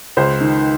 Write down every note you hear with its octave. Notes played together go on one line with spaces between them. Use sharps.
C#2 C5
D#3